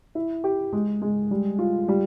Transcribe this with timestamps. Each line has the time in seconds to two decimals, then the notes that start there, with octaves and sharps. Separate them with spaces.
0.15 E4
0.44 G4
0.73 G#3
1.02 G#3
1.31 G3
1.59 F4
1.88 G3